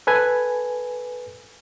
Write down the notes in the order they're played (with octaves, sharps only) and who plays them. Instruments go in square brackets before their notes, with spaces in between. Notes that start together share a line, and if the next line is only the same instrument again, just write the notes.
[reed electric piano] A4 B4 G#5